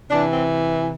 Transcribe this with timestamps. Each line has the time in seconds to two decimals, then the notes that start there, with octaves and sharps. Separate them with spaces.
0.10 C3 E3 D4
0.31 C4